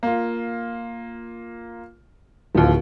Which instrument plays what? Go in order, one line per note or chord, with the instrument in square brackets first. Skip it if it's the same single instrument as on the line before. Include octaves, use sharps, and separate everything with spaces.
[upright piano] A#3 F4
[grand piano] D1 [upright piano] D#2 F3